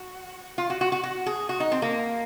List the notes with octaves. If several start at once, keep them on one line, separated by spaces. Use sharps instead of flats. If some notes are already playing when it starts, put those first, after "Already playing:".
Already playing: F#4
F4
F#4
F#4
F#4
F#4
G#4
F#4
D#4
C4
A#3